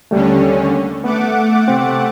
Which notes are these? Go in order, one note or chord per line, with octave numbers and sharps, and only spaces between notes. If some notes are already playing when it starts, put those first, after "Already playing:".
D#2 D3 G3 A3 C#4
A3 B3 F#5 D6
C3 C4